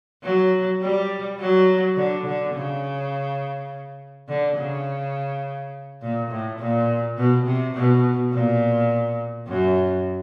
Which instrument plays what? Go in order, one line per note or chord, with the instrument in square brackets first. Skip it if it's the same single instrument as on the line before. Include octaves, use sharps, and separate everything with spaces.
[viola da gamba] F#3
G3
F#3
D3
D3
C#3
D3
C#3
A#2
A2
A#2
B2
C3
B2
A#2
F#2